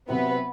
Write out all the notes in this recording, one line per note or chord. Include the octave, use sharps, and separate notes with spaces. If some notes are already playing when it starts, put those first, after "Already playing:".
C3 F#3 B3 C4 E4 B4